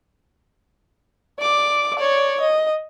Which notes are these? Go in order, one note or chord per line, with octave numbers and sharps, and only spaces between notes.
D5 D6
C#5 D5
D#5